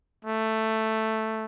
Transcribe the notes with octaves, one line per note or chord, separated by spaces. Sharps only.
A3